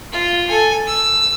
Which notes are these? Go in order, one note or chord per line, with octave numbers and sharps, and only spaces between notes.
F4
A4 G#5
E6